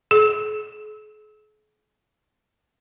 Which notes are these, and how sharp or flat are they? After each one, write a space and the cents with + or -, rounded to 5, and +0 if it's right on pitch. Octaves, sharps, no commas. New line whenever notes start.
G#4 +45